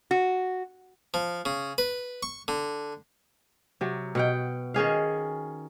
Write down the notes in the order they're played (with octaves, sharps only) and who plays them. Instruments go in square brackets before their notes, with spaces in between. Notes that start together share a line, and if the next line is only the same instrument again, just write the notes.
[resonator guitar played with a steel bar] F#4
[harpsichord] F3
C#3
B4
C#6
D3
[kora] C3 F#3
B2 F#5 G5
D#3 C#4 G#4 F5